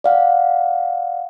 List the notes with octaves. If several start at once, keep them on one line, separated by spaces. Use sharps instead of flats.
D5 F5 F#5